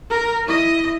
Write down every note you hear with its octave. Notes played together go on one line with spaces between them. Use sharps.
A#4
E4 D#5